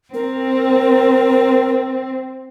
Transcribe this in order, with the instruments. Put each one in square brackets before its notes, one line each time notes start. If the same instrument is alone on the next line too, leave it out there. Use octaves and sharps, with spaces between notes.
[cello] C4 [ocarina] A#4